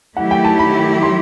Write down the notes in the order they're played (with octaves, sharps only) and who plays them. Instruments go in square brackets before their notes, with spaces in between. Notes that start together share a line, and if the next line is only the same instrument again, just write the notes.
[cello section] D#3 F#3 A3 E4 G4 [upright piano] F#5
[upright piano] G5
A5
B5
C6